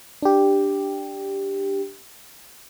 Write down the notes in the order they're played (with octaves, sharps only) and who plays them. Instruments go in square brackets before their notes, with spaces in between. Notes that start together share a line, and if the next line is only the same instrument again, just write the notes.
[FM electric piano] D4 G4